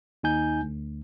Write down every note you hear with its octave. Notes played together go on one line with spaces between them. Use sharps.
D#2 D#4 G#5 G6
D2